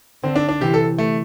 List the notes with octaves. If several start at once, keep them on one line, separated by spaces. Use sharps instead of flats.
D3 C4
D4
D4
C3 E3 G4
A4
A3